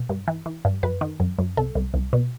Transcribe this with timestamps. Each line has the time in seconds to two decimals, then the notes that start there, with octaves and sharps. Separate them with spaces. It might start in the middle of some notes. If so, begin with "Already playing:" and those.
Already playing: B2
0.09 G2
0.28 E3
0.46 E3
0.65 G2
0.83 F#2 B4
1.01 D#3
1.20 F#2
1.38 F#2
1.57 C2 A4
1.75 C2
1.94 C2
2.13 B2